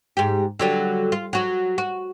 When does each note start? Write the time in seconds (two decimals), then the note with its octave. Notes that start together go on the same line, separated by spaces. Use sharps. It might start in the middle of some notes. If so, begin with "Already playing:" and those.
0.17 G#2 G4
0.59 D3 F#3 G3
1.12 F4
1.33 F#3 F#4
1.78 F#4